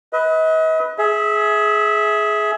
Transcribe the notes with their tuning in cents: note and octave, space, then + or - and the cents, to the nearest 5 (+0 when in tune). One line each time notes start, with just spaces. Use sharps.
B4 +0 D#5 +40
G#4 +20 E5 -10